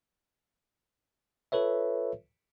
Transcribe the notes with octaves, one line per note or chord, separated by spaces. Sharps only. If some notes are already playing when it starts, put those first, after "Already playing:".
F4 A4 B4 C#5 E5